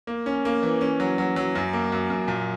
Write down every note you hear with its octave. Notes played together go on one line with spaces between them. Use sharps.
A#3
C#4
A#3
E3
C#4
F#3
F#3
F#3
F#2
A#3
F#2
F#2
A#2